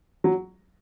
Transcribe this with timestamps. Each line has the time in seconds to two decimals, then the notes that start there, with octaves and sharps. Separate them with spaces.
0.24 F#3